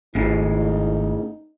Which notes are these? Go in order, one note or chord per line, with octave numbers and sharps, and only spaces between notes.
G#1 A2 C#3 D#4